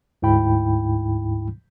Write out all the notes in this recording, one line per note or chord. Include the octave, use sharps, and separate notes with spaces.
D2 G#2 E4 G5 B5